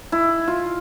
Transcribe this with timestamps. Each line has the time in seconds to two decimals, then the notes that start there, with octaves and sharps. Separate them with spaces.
0.12 E4
0.48 F4